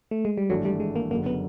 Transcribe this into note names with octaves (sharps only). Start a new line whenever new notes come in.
A3
G#3
G3
G#1 G2 E3 F#3 A3 D4
G3
G#3
A#3
F#1 F#2 D3 A#3
B3